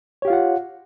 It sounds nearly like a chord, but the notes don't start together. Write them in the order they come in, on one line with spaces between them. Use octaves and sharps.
C#5 G4 F5 F4 F#5